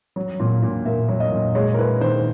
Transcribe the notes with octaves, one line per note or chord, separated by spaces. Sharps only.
F#3
A#2
A#2
A#3 E5
F#3
D#5
A#2
G#3 C#5
A#4
E4 B4
D#3 C5